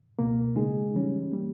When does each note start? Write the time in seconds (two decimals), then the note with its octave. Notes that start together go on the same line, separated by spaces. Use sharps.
0.19 C#2 B2 A#3
0.56 C#3 G#3 D#4 G#4
0.95 E3 G3 C#4
1.32 G3 A#3